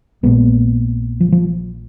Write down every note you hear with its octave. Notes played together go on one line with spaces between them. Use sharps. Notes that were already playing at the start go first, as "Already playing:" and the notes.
A#1 A#2 G#3 B3
F3
F3